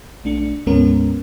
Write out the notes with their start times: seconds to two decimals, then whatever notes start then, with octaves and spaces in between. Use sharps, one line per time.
0.24 B1 A3 D4 C#7
0.67 D2 G#2 G#3 B3 C#4 A#4